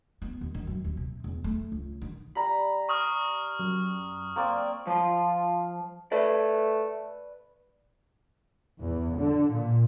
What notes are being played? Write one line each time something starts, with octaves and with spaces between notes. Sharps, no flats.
B3
D#2
D#3
F#2
D#2
C3
E2
A3
C#2
D#3
G3 A#5 B5
C#6 D#6 F6
F#2
A#3 C4 D5
F3 F4 C6
A3 B4 D5
E2
D3
A#2